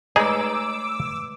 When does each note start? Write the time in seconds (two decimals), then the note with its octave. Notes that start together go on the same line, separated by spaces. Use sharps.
0.16 G#3 A3 D#4 G#4 B4 D6 E6